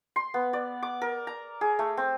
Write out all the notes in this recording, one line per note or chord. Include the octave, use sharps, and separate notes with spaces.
C6
B3
D5
D6
A#4
A#5
G#4
A3
C4